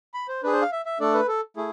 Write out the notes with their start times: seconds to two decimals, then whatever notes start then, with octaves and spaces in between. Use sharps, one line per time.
0.14 B5
0.28 C5
0.43 D4 G#4 B4
0.52 C5
0.62 F5
0.72 E5
0.85 E5
1.00 A3 D4 A4 D5
1.14 B4
1.28 A4
1.57 A3 E4 G#4